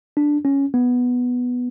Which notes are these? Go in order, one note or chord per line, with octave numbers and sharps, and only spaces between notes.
D4
C#4
B3